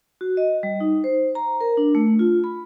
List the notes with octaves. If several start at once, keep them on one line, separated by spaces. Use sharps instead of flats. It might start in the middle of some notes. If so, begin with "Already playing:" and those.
F#4
D#5
G3
D#4
C5
A#5
A#4
D4
A3
F4
B5